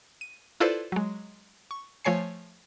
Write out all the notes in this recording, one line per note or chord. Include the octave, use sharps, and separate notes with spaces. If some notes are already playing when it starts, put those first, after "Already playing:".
D#7
E4 F4 A4 B4 C5 D5
F#3 G#3
C#6
F3 A3 C#5 G#5 C7